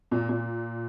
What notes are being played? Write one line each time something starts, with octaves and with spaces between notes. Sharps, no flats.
A#2
A#2